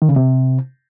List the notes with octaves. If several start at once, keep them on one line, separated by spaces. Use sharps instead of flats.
D#3
C#3
C3